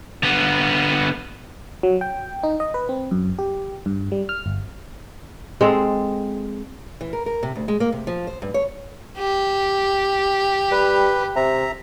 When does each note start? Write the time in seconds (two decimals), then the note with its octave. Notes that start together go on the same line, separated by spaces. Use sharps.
0.23 D3 B3
1.83 F#3
2.01 G5
2.43 D#4
2.60 D#5
2.74 B4
2.89 C4
3.11 F#2
3.39 G4
3.86 G2
4.12 G3
4.29 F6
4.46 G1
5.61 G#3 C4 A4
7.01 E3
7.13 A#4
7.26 A#4
7.43 C3
7.56 D2
7.68 G#3
7.80 A#3
7.92 C3
8.07 F3
8.27 C5
8.42 G2
8.54 C#5
9.18 G4
10.71 G3 B4
11.36 C3 E5 A#5